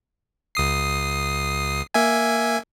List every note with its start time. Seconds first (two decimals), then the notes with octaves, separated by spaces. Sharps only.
0.55 C#2 D#6 C7
1.94 A#3 E5 G#5